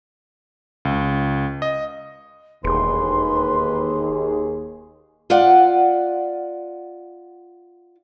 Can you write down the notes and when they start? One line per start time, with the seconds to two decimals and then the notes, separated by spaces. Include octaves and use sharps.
0.85 C#2
1.62 D#5
2.64 E1 D#2 G#4 B4 C6
5.30 F4 D5 F#5